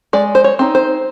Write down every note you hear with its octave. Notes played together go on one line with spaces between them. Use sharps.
G#3 D5
C5
C#5
C4 D#4
C5